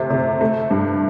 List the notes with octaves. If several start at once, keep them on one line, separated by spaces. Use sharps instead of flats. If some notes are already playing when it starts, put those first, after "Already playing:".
Already playing: C3 A3
C3
A3
G2